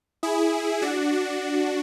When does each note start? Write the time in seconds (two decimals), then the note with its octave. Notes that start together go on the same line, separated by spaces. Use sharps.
0.23 E4 G#4
0.82 D4 F#4
1.12 D4